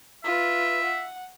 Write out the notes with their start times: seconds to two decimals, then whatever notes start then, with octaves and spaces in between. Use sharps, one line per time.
0.24 F4 B4 E5
0.84 F#5